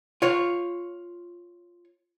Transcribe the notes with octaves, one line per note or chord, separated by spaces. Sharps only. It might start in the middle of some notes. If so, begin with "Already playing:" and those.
F4 C#5